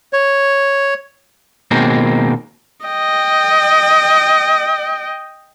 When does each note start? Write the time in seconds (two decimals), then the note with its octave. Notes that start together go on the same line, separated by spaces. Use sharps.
0.13 C#5
1.71 B2 D#3 G#3 A#3 C4
2.86 D#5 G5